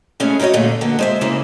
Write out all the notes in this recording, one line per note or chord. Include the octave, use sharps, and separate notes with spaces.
G#3 A3 C#4 E4 G#4
D#4 E4 F#4 C#5 D#5
F#2 A#2 D3 G#3 A3
D3 A#3 B3
G#3 C5 E5
C#3 E3 G#3 A#3 E4